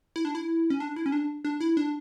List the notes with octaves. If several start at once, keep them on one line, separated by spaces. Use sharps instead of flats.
E4
D4
E4
C#4
D4
E4
C#4
D4
D4
E4
D4